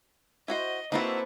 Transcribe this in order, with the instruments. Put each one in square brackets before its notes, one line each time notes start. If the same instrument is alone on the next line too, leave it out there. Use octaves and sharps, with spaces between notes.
[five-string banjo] E4 F#4 C5 [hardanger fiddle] D#5
[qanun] A#3 C4 A4 [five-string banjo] D#4 F#4 [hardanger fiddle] E4 B4